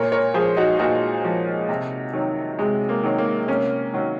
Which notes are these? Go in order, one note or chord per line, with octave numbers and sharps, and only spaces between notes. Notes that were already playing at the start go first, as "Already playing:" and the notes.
Already playing: A#2 A#4 C#5
A#4 C#5
F3 G#4 C5
D#4 F#4
A#2 D#4 F#4
F3
C3
D#3 F#3
C3 G#3
A#3
D#3 F#3
A#3
C3 A#3 C#4
D#3 F#3